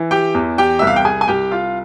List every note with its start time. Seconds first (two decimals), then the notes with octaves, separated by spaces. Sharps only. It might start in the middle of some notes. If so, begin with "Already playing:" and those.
Already playing: E3
0.11 G4 G5
0.34 E2
0.58 G4 G5
0.79 C2 E5
0.87 F5
0.96 G5
1.05 G#4 G#5
1.21 G#5
1.28 C2 G4 G5
1.51 F4 F5